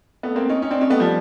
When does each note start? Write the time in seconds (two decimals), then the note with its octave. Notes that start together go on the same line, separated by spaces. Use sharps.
0.23 A3 B3
0.36 A#3 C4
0.49 C#4 D#4
0.62 C#4 D#4
0.71 C4 D4
0.81 C#4 D#4
0.90 A3 B3
1.00 F3 G3